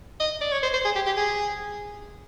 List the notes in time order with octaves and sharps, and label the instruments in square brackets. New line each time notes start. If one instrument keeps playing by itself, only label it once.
[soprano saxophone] D#5
D5
C#5
C5
C5
G#4
G4
G4
G#4